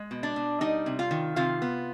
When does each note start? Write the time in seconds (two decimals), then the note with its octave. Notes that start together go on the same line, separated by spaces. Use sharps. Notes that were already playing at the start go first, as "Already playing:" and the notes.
Already playing: G#3
0.11 B2
0.23 D4 D5
0.36 B2
0.61 G3 D#4 D#5
0.86 C3
0.99 F4 F5
1.11 D#3
1.36 C3 F4 F5
1.62 B3